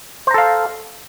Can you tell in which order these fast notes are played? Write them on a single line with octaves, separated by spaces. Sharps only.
C5 A#5 A4 F5